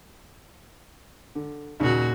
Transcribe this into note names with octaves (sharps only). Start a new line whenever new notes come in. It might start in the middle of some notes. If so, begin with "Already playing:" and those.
D3
D#2 A#2 C#3 F#4